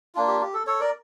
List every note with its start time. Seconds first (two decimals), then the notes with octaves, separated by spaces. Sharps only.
0.15 A#3 D4 F4
0.27 G4
0.41 G4
0.54 A4
0.67 A4 C#5
0.80 A#4 D5